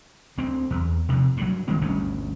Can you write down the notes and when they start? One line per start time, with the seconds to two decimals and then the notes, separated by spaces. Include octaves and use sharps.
0.38 D2 C4
0.70 E2
1.09 C3 F3
1.37 G2 F#3
1.68 D#3 G#3 C4
1.82 G1 D2 G2 C#4